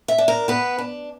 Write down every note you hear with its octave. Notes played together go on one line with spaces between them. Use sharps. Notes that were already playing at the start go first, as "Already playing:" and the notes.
E5
D4
A#4
B3 B4
D4